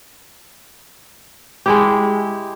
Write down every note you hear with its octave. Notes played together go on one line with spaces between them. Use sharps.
G#3 E4 G4